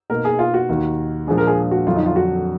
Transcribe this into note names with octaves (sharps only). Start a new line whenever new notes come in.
B2 A#3 D#4 A#4
G#4
F4
F#4
D#2 D#3 A#3 D#4
A#2 F3 G#3 D4 G#4
A#4
G#4
F#4
F2 D3 F#3 D4 F4
D#4
F4
F#4